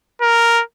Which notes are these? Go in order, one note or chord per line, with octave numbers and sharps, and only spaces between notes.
A#4